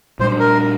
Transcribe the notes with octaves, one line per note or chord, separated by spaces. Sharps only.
A#2 G3 D4 C5
A#4